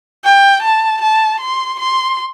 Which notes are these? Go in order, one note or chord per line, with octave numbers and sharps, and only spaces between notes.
G5
A5
A5
C6
C6